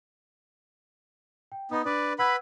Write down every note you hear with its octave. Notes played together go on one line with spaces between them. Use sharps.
G5
B3 D#4 D#6
D4 B4 D5
B4 F#5 B5 E6 G#6